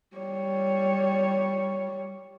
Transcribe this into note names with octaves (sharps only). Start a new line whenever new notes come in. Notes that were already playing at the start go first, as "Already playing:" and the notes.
G3 C#5